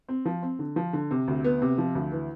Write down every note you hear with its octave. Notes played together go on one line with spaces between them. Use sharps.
C4
F3
C4
D3
F3
D3
C3
D2
B3
C3
F3
D2
E3